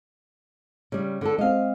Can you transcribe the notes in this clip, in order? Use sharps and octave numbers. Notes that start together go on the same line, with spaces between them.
C#3 G3
D3 B3 A4
G#3 C4 D#5 F5